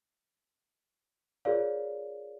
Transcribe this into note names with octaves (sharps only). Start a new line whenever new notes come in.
F4 G#4 A#4 C#5 D5 F5